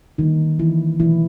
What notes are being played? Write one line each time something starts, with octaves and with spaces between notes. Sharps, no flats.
D3 D#3 G3 A#3 D#4
E3 E4
B2 E3 F#3 A3 E4